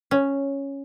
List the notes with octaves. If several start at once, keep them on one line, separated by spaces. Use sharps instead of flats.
C#4